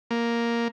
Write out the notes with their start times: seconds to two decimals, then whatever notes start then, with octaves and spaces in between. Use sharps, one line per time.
0.11 A#3